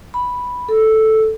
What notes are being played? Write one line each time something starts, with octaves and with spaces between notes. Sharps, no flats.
B5
A4